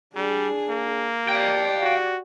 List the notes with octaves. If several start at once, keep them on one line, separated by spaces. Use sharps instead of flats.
G3 D4 G#4
A#3
G4 D5 F5 G5
F#4